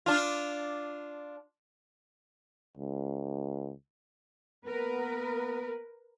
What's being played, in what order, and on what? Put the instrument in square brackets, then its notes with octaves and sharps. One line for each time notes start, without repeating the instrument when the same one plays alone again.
[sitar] D4 F4
[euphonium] C#2
[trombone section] A#3 B3 [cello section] A#4 B4